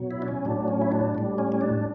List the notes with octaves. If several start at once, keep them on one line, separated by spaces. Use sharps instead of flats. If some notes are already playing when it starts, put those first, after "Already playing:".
Already playing: B2 F#3
E4
D4
C#4
A2 F#3 D4
C#4
E4
D4
A2 G3
C#4
C#4
D4